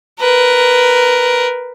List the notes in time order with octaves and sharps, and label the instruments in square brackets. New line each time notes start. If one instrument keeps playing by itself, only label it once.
[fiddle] A#4 B4